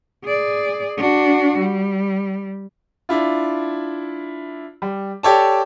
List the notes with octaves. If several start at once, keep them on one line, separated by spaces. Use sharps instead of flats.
G#4 D5
D4 F#4
G3
D4 E4 F4
G3
G4 A4 C#5 D5 A5